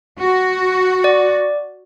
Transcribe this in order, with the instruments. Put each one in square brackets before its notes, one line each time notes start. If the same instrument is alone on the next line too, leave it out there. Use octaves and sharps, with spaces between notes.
[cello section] F#4
[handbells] D5